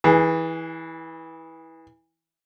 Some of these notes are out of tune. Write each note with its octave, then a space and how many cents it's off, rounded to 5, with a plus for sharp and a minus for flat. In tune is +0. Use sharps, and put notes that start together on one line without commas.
E3 -15 G#4 +0